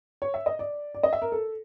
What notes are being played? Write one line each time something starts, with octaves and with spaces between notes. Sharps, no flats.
C#5
E5
D#5
D5
D5
D#5
E5
A#4
A4